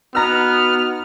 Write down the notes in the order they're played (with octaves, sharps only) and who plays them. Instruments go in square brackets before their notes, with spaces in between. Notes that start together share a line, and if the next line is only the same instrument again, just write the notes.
[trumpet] B3 [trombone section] D#4 F#4 [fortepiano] B4 A#5 [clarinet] F6